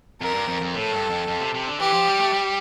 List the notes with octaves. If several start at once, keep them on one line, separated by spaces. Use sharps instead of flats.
F2 A#4
G2
F2
F2
A2 A4
G2
F2
F2
C3
C3
D3
E3 G4
F3
G3
A3
G3